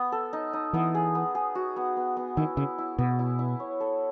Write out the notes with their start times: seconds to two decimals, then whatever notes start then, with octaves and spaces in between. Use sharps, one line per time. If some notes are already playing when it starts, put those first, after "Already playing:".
Already playing: B3
0.12 A4
0.33 D#4
0.53 D#4
0.73 E3 B3
0.94 G#4
1.15 B3
1.35 G#4
1.55 F#4
1.76 B3
1.97 B3
2.17 B3
2.37 D#3 E4
2.57 C#3 E4
2.78 E4
2.98 B2 B3
3.19 E4
3.39 E4
3.60 C#5
3.80 A4